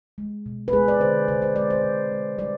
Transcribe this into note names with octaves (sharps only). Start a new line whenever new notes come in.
G#3
B2
B4
G#3 G#4
D5
D3 C5
C3 C5
C5
G#3 D5
C5
C3
G#3
G3 D5